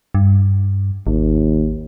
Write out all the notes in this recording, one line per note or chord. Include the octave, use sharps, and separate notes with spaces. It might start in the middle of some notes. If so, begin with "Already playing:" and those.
G2
G#1 D#2